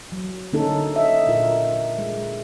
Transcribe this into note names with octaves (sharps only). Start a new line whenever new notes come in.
F#3
D3 A#3 C#4 D#4 A4
D#5 E5
A#2 F4 A#4
G#3